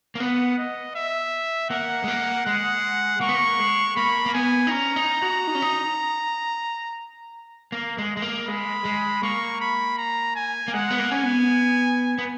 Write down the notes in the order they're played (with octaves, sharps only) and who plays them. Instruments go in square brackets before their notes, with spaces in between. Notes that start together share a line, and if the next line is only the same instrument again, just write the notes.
[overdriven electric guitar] A#3
[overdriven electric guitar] B3 [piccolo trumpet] F#5
[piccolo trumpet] D#5
E5
[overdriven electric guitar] A#3 [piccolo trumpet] F#5
[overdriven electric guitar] G#3
A#3
[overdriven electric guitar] G#3 [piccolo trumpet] F#5
[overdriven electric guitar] A#3 [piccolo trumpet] C#6
[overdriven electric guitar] B3
A#3
G#3
[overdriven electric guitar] A#3 [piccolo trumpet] B5
[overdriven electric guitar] A#3
[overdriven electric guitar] B3 [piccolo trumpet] G#5
[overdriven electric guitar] D#4
[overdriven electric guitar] C#4 [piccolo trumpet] A#5
[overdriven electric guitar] D#4
F#4
D#4
C#4
D#4
A#3
G#3
G#3
A#3
[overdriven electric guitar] G#3 [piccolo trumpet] B5
[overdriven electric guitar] G#3
[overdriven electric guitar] A#3 [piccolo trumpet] C#6
[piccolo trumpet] B5
A#5
G#5
[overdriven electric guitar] A#3
[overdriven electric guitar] G#3 [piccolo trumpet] F#5
[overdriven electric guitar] B3
A#3
[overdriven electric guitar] C#4 [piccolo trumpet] G#5
[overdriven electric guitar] B3
B3